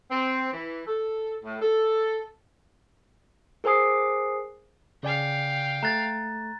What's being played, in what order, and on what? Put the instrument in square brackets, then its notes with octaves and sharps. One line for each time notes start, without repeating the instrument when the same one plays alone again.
[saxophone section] C4
E3
A4
A2
A4
[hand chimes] G#4 A#4 C5 G#5 D#6 C7
[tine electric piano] C#3 D5 G#5 [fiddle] F5 G5
[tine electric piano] A3 [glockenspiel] A#5 F#6 A6